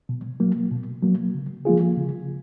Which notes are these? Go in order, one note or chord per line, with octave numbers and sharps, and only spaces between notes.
B2
F#3 A#3
B2
F#3 A#3
C#3
F3 A#3 F4 G#4
C#3